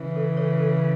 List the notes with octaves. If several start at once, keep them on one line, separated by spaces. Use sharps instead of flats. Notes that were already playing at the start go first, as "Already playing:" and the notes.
Already playing: C#3 E3
A4
A4 C#5
A4